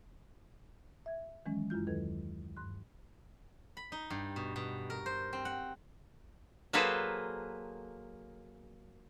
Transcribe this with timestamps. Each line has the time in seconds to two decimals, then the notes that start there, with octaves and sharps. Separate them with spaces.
1.06 E5 G#6
1.45 D#3 E3 F#3 G#3 C#4
1.70 F#2 G#3 E4 F4 G6
1.87 D#2 D#3 F#3 A4 B4 G#6
2.57 G2 C6 F#6
3.77 B5
3.92 D#4
4.10 G2
4.36 B2
4.56 B2
4.90 A#4
5.06 C5
5.33 C4
5.45 F#5
6.73 F#3 A#3 G#4 A4 B4 C5